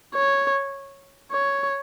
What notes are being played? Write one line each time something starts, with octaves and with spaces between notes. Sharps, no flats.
C#5
C#5